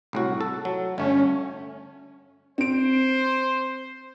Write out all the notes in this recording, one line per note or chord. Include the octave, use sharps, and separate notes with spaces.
C2 A2 F#4
A4
F#3
G1 A3 C#4
C4 C5 D7